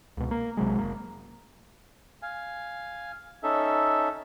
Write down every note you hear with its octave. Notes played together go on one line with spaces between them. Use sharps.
C#2 B2
A#3
B1 C3 F#3 G#3
F#1 A#3
F5 G#5
C#4 D#4 A4 E5